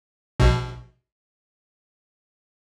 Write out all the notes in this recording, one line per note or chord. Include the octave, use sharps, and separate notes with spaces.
A#1 B2